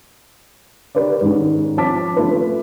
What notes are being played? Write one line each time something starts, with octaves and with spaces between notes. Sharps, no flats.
G4 A#4 B4 C#5 D5
G#2 D#3 C#4
F3 C4 C#5 A5 D6 B6
A3 C#4 F4 B4